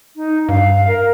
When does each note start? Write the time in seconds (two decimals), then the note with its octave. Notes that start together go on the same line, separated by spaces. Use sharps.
0.16 D#4
0.49 G2 F5
0.87 A#4